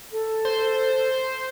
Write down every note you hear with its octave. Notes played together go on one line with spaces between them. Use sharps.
A4
C5